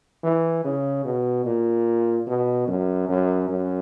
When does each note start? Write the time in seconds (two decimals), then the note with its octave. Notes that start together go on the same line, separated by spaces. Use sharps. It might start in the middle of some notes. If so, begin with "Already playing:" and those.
0.24 E3
0.65 C#3
1.05 B2
1.45 A#2
2.27 B2
2.68 F#2
3.09 F#2
3.49 F#2